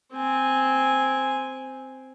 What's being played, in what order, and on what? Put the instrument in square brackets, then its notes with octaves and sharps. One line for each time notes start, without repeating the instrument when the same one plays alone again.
[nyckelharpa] C4 G#5